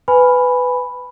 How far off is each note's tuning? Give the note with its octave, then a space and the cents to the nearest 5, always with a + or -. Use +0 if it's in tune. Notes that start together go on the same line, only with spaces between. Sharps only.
B4 +15 G#5 +0 B5 +0